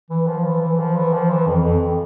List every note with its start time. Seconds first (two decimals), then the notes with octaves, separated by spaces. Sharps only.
0.10 E3
0.27 F3
0.45 E3
0.62 E3
0.79 F3
0.97 E3
1.14 F3
1.31 E3
1.47 F2
1.65 F2